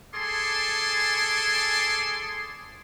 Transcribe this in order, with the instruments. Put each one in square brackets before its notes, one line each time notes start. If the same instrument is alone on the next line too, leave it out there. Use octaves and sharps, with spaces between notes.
[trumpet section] G#4 A4 G#5 A5 C6 D6